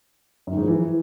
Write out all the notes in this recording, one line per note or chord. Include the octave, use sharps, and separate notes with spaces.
F#2
D#3
G#2
F3
E3